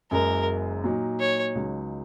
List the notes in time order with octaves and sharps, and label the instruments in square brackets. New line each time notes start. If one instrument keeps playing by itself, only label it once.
[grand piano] F#1 F#2 C#3 G#3 [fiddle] A#4
[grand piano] A#2 F#3 D#4
[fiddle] C#5
[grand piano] C#2 C#3 F#3 D#4